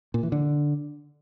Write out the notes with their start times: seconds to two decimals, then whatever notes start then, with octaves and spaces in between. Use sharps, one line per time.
0.14 A#2
0.23 E3
0.32 D3